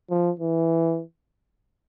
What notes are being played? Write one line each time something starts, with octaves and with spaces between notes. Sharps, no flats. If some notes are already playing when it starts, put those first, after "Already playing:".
F3
E3